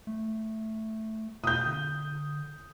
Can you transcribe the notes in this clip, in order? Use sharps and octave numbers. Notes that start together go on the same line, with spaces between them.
A3
B2 D#6 G6
D3